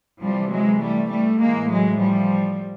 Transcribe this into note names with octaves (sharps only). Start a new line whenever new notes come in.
C3 E3 F3 G3
F#3 G#3
G3 A3
G3 A3
A2 E3 G#3 A#3
F#3 G#3
F3 G3